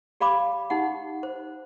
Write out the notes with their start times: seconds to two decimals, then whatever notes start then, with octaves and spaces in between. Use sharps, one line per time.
0.20 G4 D5 F5 B5 D6
0.70 D#4 G4 F#5
1.23 C5